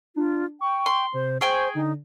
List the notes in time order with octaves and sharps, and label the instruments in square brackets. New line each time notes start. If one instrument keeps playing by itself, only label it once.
[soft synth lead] D4 [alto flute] F4
[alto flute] G5 [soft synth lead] C#6
[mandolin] C6
[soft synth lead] C3 [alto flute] C5
[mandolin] G#4 G5 G#5 [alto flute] C5 [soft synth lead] C#6
[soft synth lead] D3 [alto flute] D#4